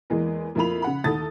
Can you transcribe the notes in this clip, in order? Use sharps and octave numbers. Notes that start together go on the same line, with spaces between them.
E2 E3 G#3 A#3
F2 A#3 E4 F4 B5 F7
C#3 F#5 B5
D#2 E4 A4 D#6 A6